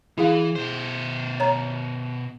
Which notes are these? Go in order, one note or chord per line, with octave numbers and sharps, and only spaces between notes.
E3 E4 G#4 F5
B2 C5
C#5 A#5